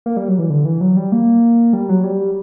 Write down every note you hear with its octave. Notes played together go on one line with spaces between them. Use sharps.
A#3
G3
F#3
E3
D3
E3
F#3
G3
A#3
G3
F#3
G3